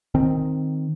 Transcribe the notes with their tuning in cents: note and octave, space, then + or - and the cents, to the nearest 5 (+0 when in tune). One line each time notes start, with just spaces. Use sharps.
D#3 +0 C4 +0